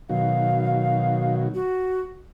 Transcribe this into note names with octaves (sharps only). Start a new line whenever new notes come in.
B2 D#3 F#3 F5
F#4